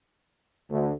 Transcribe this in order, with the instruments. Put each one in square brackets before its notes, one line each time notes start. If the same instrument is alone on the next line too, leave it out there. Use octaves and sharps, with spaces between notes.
[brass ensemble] D2